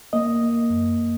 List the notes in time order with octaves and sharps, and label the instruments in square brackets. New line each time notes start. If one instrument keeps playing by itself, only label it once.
[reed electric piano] A#3 D#5
A#3
F#2